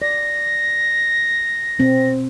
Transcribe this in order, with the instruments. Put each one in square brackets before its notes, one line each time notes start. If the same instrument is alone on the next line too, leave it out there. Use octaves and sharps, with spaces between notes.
[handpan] D5 [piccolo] A#6
[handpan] B2 C4